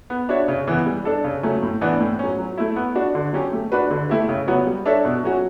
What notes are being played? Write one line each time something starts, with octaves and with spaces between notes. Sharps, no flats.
B3
D4 F#4 C#5 E5
C#3
E3 B3
G3
D4 A4
C#3
F#3 A3 C#4
A2
E3 B3 D4
A2
F#3 C#4
F#3
A3 E4
B3
D4 F#4
D3
F#3 C#4 G4
A3
D4 F#4 B4
D3
A3 E4 G4
C#3
F#3 B3 F#4 C#5
G3
D4 A4 C#5 E5
B2
F#3 C#4 F#4